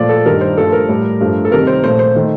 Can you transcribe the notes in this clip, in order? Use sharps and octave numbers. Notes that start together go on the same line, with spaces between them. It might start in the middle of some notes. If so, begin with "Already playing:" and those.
Already playing: A#2 F3 A3 D5
A4
G2 D#3 G3 A#4
C5
G2 F3 A3 A4
A#4
A2 G3
G2 F3 A3
A4
C3 D#3 G3 A#4
C5
A#2 F3 A3 C5
C5
D#3 A3